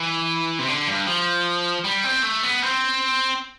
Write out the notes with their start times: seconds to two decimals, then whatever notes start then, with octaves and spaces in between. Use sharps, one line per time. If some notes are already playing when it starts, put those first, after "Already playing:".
Already playing: E3
0.59 C3
0.68 D3
0.88 G2
1.07 F3
1.85 G3
2.04 C4
2.23 A3
2.43 B3
2.62 C4